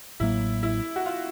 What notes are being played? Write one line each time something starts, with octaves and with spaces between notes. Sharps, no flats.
A1 A2 F#3 A#3 E4
E4
F#4
F4